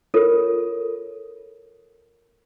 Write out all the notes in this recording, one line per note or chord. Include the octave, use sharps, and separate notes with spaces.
F4 A4 A#4 C#5